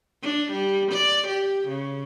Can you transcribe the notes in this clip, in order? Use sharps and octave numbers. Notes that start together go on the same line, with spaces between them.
D4
G3
D5
G4
C#3